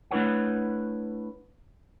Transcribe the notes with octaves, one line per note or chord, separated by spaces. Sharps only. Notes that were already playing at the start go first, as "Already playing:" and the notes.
A3 D4 E4 B4 C#5 F#5